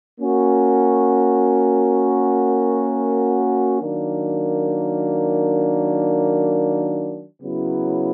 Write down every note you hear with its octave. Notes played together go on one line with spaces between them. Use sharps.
A#3 C#4 F#4 A#4
D#3 F#3 A#3 D4
C#3 F#3 B3 E4